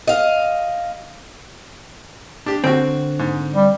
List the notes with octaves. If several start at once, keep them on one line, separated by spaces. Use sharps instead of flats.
D#5 F5
D4 G4
D3 C4 F#4 G5
G#2
G3